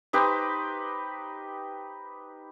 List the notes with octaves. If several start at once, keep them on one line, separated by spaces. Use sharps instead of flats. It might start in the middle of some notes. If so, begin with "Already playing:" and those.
D#4 G4 B4 C5